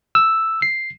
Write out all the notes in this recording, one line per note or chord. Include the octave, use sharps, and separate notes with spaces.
E6
C7